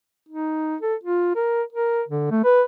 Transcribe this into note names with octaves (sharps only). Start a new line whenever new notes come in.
D#4
A4
F4
A#4
A#4
D3
A3
B4